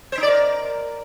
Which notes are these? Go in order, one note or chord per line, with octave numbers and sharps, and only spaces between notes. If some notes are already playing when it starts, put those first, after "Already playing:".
C5
D#4
D5
A#4